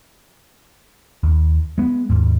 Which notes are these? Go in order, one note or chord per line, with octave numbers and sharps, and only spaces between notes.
D#2
G#3 B3
D#2 G#2